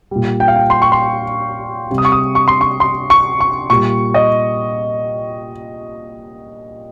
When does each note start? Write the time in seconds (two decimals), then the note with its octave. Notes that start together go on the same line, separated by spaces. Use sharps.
0.11 A#2 G3
0.40 G5
0.48 F5
0.56 G5
0.70 C6
0.82 C#6
0.92 C6
1.90 C3 G3
1.98 D#6
2.05 C#6
2.12 D#6
2.35 C#6
2.48 C6
2.61 C#6
2.80 C6
3.10 C#6
3.40 C#6
3.70 A#2 G3 C#6
4.14 D#5